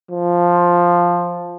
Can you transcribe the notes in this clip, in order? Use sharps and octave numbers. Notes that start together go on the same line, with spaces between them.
F3